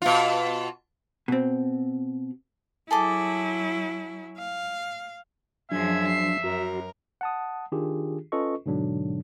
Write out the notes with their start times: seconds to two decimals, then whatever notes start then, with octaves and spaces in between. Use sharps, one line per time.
0.02 B2 F4
1.28 B2 C4
2.91 F#3 E4 G#4 A4 D6
4.38 F5
5.72 F#2 F3 F#3 D4 G#4 E5 G#6
6.08 C7
6.44 F#2 F#4 A#4
7.21 F#5 A5 D#6
7.72 D#3 D4 F4 G4 G#4
8.32 C#4 F4 A4 B4 D#5 C#6
8.66 G#2 B2 D3 F#3 D4